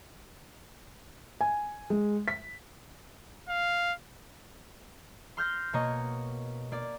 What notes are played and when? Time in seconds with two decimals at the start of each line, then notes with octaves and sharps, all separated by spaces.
1.41 G#5
1.90 G#3
2.28 B6
3.49 F5
5.37 C6 F6 G6 A#6
5.73 B2 A#3 C#5 D#5 A#5
6.72 A#3 D5